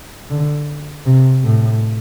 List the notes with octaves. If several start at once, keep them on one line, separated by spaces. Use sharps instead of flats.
D3
C3
A2